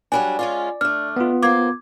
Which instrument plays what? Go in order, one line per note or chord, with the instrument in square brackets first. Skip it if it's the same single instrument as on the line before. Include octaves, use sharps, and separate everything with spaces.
[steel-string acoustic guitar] F#3 G3 D4 [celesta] G#5
[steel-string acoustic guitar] G#3 C#4 F4 [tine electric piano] D5
[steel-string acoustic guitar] A3 D4 [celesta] F6
[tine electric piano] B3 F4
[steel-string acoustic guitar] A#3 C5 [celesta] D6 G#6